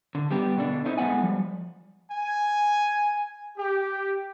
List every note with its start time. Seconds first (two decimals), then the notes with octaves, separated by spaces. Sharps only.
0.15 D3
0.31 G3 B3 G4
0.57 B2 D3 D4
0.86 A3 C4 D#4 E4
0.98 A2 G#3 A3 B3 F#5 G#5
1.21 F3 G3
2.12 G#5
3.57 G4